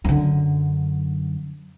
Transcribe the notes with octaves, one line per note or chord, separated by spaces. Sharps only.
F#2 D3